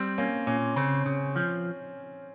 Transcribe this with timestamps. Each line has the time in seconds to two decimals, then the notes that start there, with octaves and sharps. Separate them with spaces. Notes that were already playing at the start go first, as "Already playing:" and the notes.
Already playing: G3 C4
0.18 A#3 C#4
0.47 A#2 C#4
0.76 C#3 C4
1.06 C#3
1.36 F3